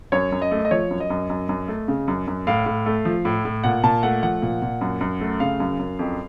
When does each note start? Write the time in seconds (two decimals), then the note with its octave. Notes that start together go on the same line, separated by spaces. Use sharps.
0.12 F#2 C#5
0.32 F#2
0.42 D#5
0.51 A3
0.65 D#5
0.71 F3 C#5
0.90 F#2
1.00 D#5
1.10 F#2
1.29 F#2
1.49 F#2
1.68 A3
1.88 C#3
2.08 F#2
2.27 F#2
2.47 A2 F5
2.66 A2
2.86 A3
3.05 F3
3.25 A2
3.45 A2
3.64 A#2 F#5
3.84 A#2 A5
4.03 A3 F#5
4.23 F3 F#5
4.42 A#2
4.62 A#2
4.81 F#2
5.01 F#2
5.21 A3
5.40 C#3 F5
5.60 F#2
5.79 F#2
5.99 F2